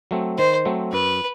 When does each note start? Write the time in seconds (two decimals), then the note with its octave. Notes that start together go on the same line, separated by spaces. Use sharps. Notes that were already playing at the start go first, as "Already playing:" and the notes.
0.11 F#3 A3 C4
0.38 D#3 C5
0.65 F#3 A3 C4
0.92 F#2 B4